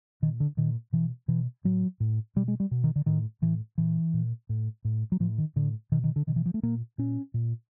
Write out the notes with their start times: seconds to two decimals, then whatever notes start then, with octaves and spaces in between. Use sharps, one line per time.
0.22 A#2 D#3
0.40 D3
0.57 A#2 D#3
0.93 B2 E3
1.28 B2 E3
1.64 A2 F#3
2.00 A2
2.36 B2 G3
2.48 G#3
2.60 G3
2.71 B2
2.84 D#3
2.96 D3
3.06 A2 D#3
3.42 A2 E3
3.78 A#2 E3
4.14 A#2
4.49 A2
4.85 A2
5.12 F#3
5.20 A2 F3
5.38 D#3
5.56 A2 D3
5.92 B2 D#3
6.04 D#3
6.16 D3
6.27 B2 D#3
6.36 E3
6.46 F3
6.54 A3
6.63 A#2 A#3
6.98 A#2 C#4
7.34 A#2